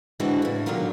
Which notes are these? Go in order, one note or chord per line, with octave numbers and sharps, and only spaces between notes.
D3 E3 G#3 C4 E4 F#4
A2 C#3
B2 D3 D#3 F#3 F4 A#4